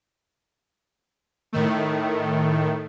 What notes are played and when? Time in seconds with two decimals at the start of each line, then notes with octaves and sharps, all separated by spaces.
1.53 A2 D#3 A3